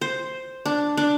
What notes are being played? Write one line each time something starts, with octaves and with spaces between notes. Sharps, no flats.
C5
D4
D4